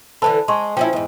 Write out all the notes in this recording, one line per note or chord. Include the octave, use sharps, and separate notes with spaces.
D3 E3 A4 C5 A5 B5
G#3 C6 C#6
F3 C#4 E4 G5
E2 G#2